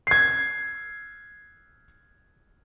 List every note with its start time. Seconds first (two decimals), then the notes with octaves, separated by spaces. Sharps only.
0.07 G#6 C7